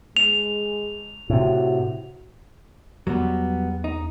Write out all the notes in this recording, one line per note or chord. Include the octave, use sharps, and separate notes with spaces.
G#3 F7
A2 C3 F#4
E2 F#3 G3 B3
D#4